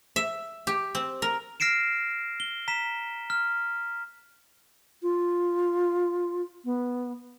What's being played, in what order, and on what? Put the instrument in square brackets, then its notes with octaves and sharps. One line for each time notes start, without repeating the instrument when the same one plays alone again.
[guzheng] E5
G4
C4
A#4
[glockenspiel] F6 A#6 C7 D7 E7
G7
A#5 B6 E7
F6
[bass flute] F4
B3